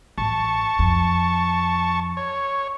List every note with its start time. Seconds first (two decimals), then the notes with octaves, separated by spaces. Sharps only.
0.18 A1 A5 C#6
0.79 F2
2.17 C#5